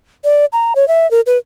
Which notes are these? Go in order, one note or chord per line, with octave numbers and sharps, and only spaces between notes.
D5
A#5
C#5
E5
A#4
B4